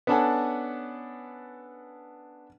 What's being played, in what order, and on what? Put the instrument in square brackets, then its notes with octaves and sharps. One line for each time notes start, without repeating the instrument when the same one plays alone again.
[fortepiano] B3 C#4 D4 A4 F#5 G#5